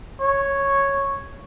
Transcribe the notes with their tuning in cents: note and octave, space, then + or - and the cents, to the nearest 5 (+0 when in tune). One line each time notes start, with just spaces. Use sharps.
C#5 -5